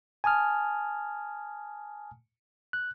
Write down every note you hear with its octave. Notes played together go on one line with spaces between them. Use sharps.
G#5 A5 D#6 F6
F#6